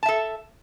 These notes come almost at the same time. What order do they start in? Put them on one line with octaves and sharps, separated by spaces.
A5 E5 A4